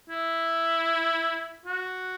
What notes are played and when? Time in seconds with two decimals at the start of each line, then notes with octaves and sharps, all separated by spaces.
0.10 E4
1.66 F#4